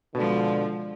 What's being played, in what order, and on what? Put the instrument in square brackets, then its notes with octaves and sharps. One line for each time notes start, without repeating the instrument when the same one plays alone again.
[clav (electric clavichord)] B2 [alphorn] D3 [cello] F3 G#3